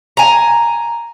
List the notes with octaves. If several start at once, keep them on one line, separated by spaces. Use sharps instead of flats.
G#5 A#5